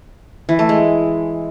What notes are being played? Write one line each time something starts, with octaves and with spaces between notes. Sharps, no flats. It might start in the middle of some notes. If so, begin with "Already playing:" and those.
E3
A3
G#3